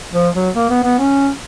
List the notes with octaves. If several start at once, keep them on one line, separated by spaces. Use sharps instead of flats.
F3
F#3
A#3
B3
B3
C#4